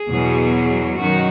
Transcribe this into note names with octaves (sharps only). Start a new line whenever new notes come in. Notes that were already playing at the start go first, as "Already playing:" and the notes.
Already playing: G#4
E2 B2 F#3
F#2 D#3 F#4